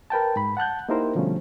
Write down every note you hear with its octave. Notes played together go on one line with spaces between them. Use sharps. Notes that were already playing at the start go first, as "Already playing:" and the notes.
A#4 B4 G5 A5
G#2 B5
F#5 A5 F#6 G6
A#3 D#4 E4 G4 A#4 C5
B2 D3 F3 G3 A3 C#4